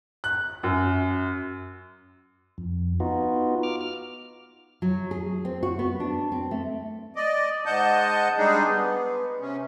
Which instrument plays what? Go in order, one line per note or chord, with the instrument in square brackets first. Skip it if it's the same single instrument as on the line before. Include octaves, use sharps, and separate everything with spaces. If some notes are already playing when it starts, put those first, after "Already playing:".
[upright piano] F#6
F#2
[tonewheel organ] F2
B3 D#4 F4 F#4
D6 F6
F6
[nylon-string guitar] F#3
G#4
C4
F#4
B3
D4
C4
A3
[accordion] D5 D#5
G#2 D#5 F#5 A5 G6
G3 G#3 D4 D#4 G#4
B3
C3 C#4